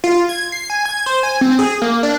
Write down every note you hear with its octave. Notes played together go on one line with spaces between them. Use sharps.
F4
G#6
C7
G#5
G#6
C5
G#5
C4
G#4
A#3
D4